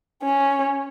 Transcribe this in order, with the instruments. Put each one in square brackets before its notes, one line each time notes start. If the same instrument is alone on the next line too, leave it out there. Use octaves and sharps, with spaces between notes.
[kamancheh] C#4